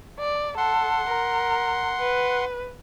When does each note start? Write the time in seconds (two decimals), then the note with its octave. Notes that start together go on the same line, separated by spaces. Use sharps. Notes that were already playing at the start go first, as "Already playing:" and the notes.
0.19 D5
0.57 A4 F#5 C6
1.07 A#4
2.00 B4